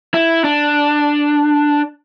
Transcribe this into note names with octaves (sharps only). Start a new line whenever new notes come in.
E4
D4